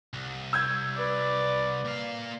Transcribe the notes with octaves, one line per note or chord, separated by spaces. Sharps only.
C2
E6 G6 G#6
B4 D5
A#2 F5